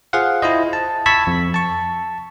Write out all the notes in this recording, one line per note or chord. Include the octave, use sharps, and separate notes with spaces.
F4 G#4 C5 F5 F#5
E4 F4 C5 D#5
A5
A5 B5 C#6 E6 G#6 B6
F2
A5 C#6